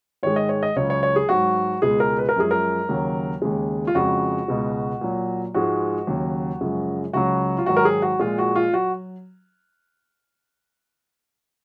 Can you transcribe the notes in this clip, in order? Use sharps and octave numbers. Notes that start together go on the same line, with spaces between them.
G#2 D#3 G#3 C#5
D#5
C#5
D#5
C#2 C#3 F#3 C#5
C#5
C#5
G#4
G#2 F#3 F#4
C#2 B2 G#3 G#4
A#4
B4
A#4
F#2 F3 G#3 G#4
A#4
D#2 C#3 F#3
D#2 C#3 G#3
F4
F2 C#3 G#3 F#4
C#2 B2 G#3
A#2 F#3
G#2 F3 G#3 F#4
D#2 C#3 F#3
F#2 C#3 F3 G#3
C#2 C#3 F#3 F#4
F4
G#2 D#3 F#3 F#4
A#4
G#4
F#4
A#2 F3 G#3 F4
F#4
F4
F#3 F#4